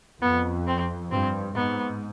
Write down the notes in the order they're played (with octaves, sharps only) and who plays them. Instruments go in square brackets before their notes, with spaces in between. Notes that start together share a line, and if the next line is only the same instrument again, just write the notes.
[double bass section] F2 [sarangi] B3
[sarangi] C4
[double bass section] G2 [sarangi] C4
[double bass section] G#2 [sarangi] B3